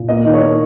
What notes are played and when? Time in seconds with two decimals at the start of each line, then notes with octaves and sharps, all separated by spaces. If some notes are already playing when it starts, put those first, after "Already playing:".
Already playing: A#2
0.09 A#3 D#5
0.25 D#3
0.33 C#5
0.42 A#3